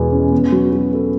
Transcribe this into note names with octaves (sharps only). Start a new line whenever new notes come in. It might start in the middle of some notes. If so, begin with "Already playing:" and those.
Already playing: E2 B2 G#3
C#4
B3
F#3
F#4
A4